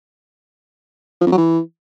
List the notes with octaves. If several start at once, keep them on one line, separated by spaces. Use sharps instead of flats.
F3
F2
F#3
E3